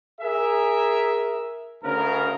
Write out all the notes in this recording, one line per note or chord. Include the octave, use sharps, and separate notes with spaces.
G#4 A#4 E5
D2 C#3 A#4